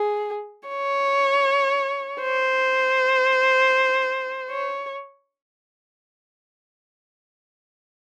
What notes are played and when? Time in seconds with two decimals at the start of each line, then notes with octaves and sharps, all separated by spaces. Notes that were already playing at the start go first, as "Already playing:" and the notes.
Already playing: G#4
0.69 C#5
2.21 C5
4.50 C#5